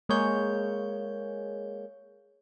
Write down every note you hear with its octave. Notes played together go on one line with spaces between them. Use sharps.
G#3 A#3 G#4 C#5 G6